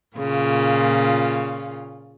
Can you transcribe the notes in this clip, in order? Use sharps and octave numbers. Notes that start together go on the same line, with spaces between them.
A#2 C#3 F4